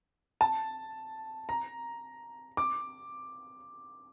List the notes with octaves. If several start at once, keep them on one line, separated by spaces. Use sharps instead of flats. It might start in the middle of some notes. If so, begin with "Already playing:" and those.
A5
A#5
D6